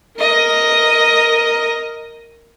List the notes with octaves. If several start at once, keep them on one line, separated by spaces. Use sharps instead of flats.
A#4 D#5